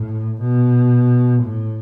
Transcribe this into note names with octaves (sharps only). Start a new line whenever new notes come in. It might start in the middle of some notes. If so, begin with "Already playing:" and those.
Already playing: A2
B2
A2